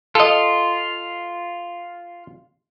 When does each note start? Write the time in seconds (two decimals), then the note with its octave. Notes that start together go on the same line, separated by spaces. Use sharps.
0.15 F4 A4 D#5